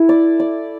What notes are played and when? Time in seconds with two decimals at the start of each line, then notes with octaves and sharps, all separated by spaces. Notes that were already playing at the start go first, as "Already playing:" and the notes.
Already playing: E4 A4
0.09 D5
0.40 D5